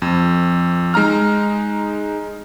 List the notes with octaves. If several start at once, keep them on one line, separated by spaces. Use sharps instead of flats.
F2
G#3 D#4 A#5 F6